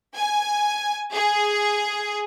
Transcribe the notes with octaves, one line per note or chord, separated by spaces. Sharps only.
G#5
G#4